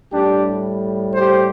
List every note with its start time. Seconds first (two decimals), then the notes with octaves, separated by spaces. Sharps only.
0.13 A2 G3 D4 G4
1.15 G4 C5